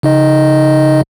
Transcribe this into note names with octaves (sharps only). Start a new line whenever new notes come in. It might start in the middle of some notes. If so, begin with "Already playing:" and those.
C#3 D#4 D#5